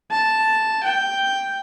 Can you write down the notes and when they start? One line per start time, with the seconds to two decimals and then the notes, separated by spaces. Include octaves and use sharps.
0.11 A5
0.83 G5